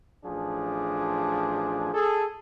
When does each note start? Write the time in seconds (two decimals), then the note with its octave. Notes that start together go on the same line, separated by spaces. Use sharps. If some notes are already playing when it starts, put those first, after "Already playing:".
0.24 A1 F3 D4 G#4
1.93 G#4 A4